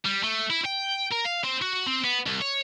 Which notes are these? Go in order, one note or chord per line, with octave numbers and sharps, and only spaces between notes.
G3
A3
E4
G5
A#4
F5
C4
F#4
C4
B3
C2
C#5